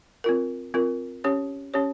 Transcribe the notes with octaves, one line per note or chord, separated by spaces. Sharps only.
C4 F4 A#4
C4 F4 A#4
C#4 G4 C#5
C#4 G4 C#5